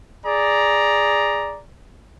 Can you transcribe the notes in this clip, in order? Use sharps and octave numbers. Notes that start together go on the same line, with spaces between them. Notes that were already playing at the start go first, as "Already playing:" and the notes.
G#4 D5 A#5